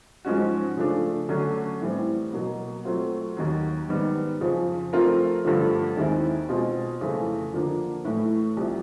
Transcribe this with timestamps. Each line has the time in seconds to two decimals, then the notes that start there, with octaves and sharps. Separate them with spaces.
0.25 G#2 F3 G#3 C#4 F#4
0.77 C#3 F3 A3 D4
1.29 D3 F#3 A3 C#4
1.81 A2 E3 G3 C4
2.33 B2 F#3 A#3
2.85 F#3 A3 C4 F4
3.37 D#2 D#3 F#3
3.89 G#2 D#3 G3 B3
4.41 F2 C#3 F3
4.93 F3 A3 C4 F4 A#4
5.45 G2 D3 F3 A3
5.97 D#2 D#3 G#3 C4 E4
6.49 B2 G#3 C4 F4
7.01 F2 C#3 E3 A3
7.53 D3 F3 A#3 D4
8.05 A2 E3 A3
8.57 C2 C3 F3